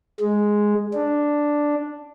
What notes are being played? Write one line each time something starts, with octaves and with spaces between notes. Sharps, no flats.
G#3
D4